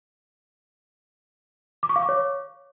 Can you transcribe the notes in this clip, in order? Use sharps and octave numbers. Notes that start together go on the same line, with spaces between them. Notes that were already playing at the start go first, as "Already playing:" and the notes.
D6
C#6
F5
D6
C#5